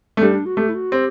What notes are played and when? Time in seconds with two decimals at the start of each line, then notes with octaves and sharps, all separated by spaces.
0.17 A3
0.21 G3 D4
0.33 D4
0.45 F#4
0.57 A3 G4
0.69 E4
0.75 F#4
0.92 C4 G4